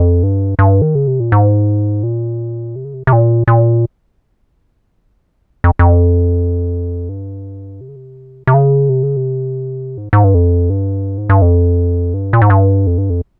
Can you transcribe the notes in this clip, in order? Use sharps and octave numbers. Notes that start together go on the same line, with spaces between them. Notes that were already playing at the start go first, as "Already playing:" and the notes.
Already playing: F2
G2
G2
D#3
C#3
C3
A#2
G#2
A#2
C3
C#3
C3
C3
A#2
A#2
F2
F2
G2
C3
C#3
C3
C3
C#3
C3
C#3
C3
G#2
G#2
G2
F2
G2
G#2
G2
F2
G2
A#2
G#2
G2
F2
G2
F2